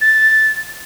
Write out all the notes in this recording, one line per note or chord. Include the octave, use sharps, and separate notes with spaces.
A6